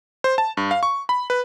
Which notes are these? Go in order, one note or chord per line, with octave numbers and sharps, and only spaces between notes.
C5
A5
G2
F5
C#6
B5
B4